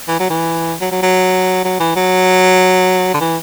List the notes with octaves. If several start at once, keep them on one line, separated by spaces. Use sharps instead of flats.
E3
F#3
E3
F#3
F#3
F#3
F#3
E3
F#3
D3
E3